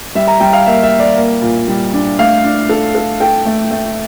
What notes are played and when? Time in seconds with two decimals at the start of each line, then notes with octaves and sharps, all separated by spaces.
0.15 G3 E5
0.27 A#5
0.40 G3 G5
0.53 F5
0.66 A#3 E5
0.83 E5
0.92 A#3
1.00 D5
1.17 A#3
1.42 A#2
1.68 G3
1.93 D4
2.19 A3 F5
2.44 D4
2.69 A4
2.95 A4
3.20 A4 G5
3.46 A3
3.71 A3